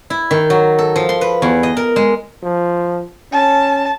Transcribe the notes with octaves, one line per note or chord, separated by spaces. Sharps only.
E4
D#3
F#3
A4
F3
C6
B4
E2
D#5
A#4
G#3
F3
C#4 A5